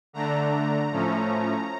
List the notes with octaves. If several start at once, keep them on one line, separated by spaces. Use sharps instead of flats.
D3 A3 D4 A#5
A2 F3 A3 C#4